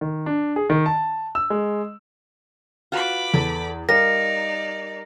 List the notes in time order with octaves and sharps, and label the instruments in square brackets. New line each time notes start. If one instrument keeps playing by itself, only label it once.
[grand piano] D#3
D4
G#4
D#3
A5
E6
G#3
[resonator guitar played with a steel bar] F4 F#4 B4 [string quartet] B5 D6
[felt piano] E2 [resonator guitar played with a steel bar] A4 B4
[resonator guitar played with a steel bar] G3 F5 [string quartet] D#4 D5 [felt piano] A#4 [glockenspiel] A#6